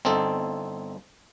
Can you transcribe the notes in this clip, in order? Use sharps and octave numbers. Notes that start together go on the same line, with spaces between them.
G1 C4 D#4 A4